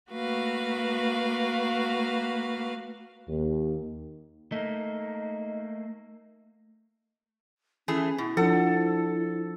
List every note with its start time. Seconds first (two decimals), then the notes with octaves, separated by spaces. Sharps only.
0.11 A3 A#3 F#4 B4 F5
3.29 D#2
4.52 A3 A#3 D#4
7.88 E3 A3 C#4 G#4
8.18 B2 E4
8.37 F3 D4 A4 F#5